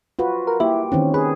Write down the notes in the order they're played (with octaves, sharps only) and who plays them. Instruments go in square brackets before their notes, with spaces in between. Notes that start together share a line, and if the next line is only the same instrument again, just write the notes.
[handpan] F4 F#4 B4
[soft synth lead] A#4
[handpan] A#3 G4 [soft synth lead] E4
[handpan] D#3 C4 C#4 [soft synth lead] E3
[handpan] G#4 [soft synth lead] B4